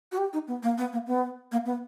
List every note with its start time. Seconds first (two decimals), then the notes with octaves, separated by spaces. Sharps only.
0.12 F#4
0.18 G4
0.33 D#4
0.48 B3
0.63 A#3
0.78 B3
0.93 A#3
1.07 B3
1.52 A#3
1.66 B3